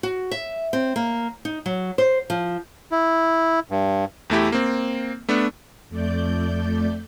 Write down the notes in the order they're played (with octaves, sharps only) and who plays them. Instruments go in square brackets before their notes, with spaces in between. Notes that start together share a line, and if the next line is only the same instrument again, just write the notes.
[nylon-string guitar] F#4
E5
C4
A#3
D#4
F#3
C5
F3
[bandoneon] E4
G2
[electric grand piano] E2 A3 E4 G4
A#3 C4
A3 B3 D4
[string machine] F2 A3 D5 G6